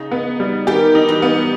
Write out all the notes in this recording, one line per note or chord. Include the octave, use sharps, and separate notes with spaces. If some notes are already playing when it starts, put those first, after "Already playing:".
Already playing: C#3 D#4
B3
G3
D#3 G4
D#4
E3
B3